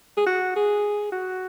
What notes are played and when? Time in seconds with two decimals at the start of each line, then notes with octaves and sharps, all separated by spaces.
0.17 G#4
0.26 F#4
0.56 G#4
1.12 F#4